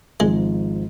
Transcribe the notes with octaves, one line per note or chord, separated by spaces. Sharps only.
G#1 G#2 F3 G#3